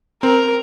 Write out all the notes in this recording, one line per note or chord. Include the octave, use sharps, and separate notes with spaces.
C4 A#4